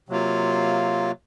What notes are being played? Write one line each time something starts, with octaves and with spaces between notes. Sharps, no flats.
C3 F#3 A#3 F4